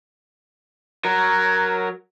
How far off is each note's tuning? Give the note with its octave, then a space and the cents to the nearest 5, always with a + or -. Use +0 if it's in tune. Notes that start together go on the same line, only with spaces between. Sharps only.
F#3 +0 A#4 +0